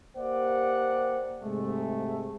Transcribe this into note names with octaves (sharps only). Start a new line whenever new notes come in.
A#3 G4 C5 D5 F#5
G#2 C3 G#3 A3